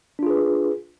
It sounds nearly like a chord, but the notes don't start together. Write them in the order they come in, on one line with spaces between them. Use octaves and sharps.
D4 F4 G#4 B4